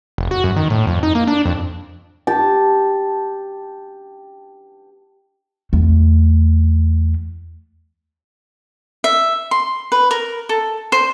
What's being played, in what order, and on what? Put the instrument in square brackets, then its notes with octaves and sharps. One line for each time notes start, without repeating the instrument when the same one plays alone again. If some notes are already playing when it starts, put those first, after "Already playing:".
[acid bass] F1
F#4
F#2
D#3
A2
F2
D#4
A#3
D4
F2
[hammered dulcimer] G4 A5
[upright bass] E2 A3
[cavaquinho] E5
C6
B4
A#4
A4
C5